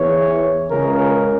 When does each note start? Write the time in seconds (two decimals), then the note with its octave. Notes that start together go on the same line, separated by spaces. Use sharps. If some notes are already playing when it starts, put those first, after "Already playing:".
Already playing: E2 E3 C#5
0.71 C#2 C#3 A#4